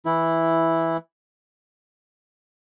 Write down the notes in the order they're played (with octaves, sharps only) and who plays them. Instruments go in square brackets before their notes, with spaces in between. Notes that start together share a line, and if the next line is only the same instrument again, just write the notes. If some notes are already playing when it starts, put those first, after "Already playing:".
[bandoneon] E3 E4